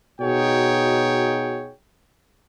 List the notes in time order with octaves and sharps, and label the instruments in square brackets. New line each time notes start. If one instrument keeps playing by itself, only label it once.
[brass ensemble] B2 D#4 F#4 G#4 C#5 G5